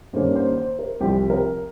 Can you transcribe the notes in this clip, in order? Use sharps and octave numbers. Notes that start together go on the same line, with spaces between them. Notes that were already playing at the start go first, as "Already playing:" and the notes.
G2 D#3 A#3 C#4 C5
C5
C5
A#4
C2 C3 F3 C4 G4
A#4